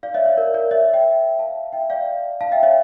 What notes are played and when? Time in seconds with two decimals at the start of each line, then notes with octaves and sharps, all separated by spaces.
0.03 D5 F5
0.14 C#5 E5
0.26 C#5
0.37 A#4 D5
0.54 A#4 D5
0.71 C#5 E5
0.94 E5 G5
1.39 F5 A5
1.73 E5 G5
1.90 D5 F5
2.41 F5 A5
2.52 E5 G5
2.63 C#5 E5